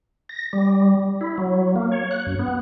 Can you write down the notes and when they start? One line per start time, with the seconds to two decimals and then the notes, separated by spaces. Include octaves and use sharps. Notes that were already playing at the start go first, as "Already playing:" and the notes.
0.29 A#6
0.53 G3
1.21 E4
1.38 F#3
1.76 A#3
1.92 C#5
2.11 F#6
2.26 F#2
2.39 B3